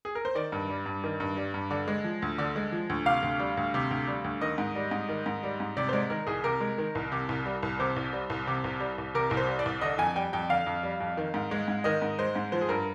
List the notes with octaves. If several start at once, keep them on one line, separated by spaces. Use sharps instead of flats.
G#4
A#4
C5
D#3 D5
G2
G3
G2
D#3
G2
G3
G2
D3
G#3
F3
D2
D3
G#3
F3
D2
C3 F5
D2
G3
D2
C3
D2
G3
D2
D#3 D#5
G#2
G3
G#2
D#3
G#2
G3
G#2
C3 D5
C5
G#3 D5
D#3 A#4
C2 G#4
C3 A#4
G#3
D#3
C2
C3
C2
G3
C2
C3 C5
C2
G3
C2
C3
C2
G3
C2
C3 A#4
C2 A#4
C5
G3
D5
C2
D3 D#5
F2 G#5
G3 G5
F2 G5
D3 F5
F2
G3
F2
D#3
G#2
G#3
G#2
D#3 D#5
G#2
G#3 C5
G#2
F3 C5
G#4
G2 A#4